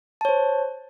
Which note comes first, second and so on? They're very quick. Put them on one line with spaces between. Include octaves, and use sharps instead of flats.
A5 C#5 C5